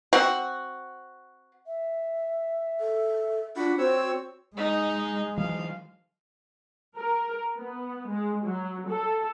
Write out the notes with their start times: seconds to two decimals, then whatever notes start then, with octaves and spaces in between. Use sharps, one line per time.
0.13 C4 F#4
1.67 E5
2.80 A4
3.57 D4 F4 F#4 F#5 B5
3.78 C4 F#4 C5 C#5 E6
4.57 G#3 D#4
5.38 E3 F#3 F5
6.96 A#4
7.57 B3
8.07 G#3
8.43 F#3
8.89 A4